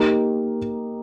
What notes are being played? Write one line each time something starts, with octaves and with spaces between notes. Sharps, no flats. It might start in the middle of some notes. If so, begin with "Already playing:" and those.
Already playing: A#3 D#4 G4 A#4